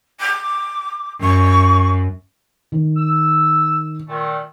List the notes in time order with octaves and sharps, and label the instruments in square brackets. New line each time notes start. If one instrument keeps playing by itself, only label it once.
[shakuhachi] D6
[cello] F#2 [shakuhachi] C#6
[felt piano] D#3
[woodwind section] E6
A#2 D#3 A3